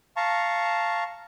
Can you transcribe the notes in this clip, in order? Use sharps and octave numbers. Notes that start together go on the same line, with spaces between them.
F5 A5 A#5 C#6